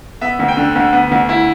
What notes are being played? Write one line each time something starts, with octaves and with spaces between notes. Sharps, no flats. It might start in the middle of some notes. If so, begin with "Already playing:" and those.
B3 E5
D2
G5
D3
D2
B3
D2
E4